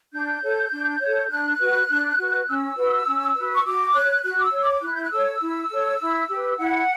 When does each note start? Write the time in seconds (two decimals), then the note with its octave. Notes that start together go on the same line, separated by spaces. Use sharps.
0.13 D4 G6
0.42 A4 C#5
0.71 D4
1.01 A4 C#5
1.30 D4 F#6
1.60 F#4 B4
1.89 D4
2.18 F#4 B4
2.48 C#4 E6
2.77 F#4 B4
3.06 C#4
3.36 F#4 B4
3.53 C#6
3.65 F#4 D6
3.94 C#5 F#6
4.23 F#4 F#6
4.38 D6
4.43 E6
4.52 C#5
4.63 D6
4.82 E4 F#6
4.95 G6
5.03 F#6
5.11 A4 C#5 E6
5.40 E4
5.70 A4 C#5
6.00 E4
6.29 G4 B4
6.58 E4 F#5